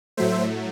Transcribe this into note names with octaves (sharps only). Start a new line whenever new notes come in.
A2 F#3 A3 C5 E5